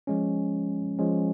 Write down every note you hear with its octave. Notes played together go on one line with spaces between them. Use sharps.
F3 G#3 C#4
F3 G#3 C#4